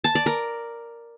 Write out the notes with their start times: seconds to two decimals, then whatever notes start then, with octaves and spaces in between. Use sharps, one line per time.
0.04 A5
0.15 D5
0.26 A#4